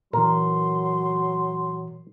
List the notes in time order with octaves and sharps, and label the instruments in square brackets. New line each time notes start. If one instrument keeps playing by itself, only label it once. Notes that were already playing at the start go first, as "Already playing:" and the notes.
[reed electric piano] A#2 E3 [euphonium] F#3 [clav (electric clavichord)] A#4 [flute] C6